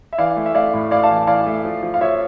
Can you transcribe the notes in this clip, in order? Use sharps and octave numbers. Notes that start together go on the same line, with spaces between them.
E5
E3 D5 F5
A3
E5
A3 D5 F5
A2
A2 D5 F5
F5 A5
E3
E3 D5 F5
A3
F3
F3
F5
F3 C#5 E5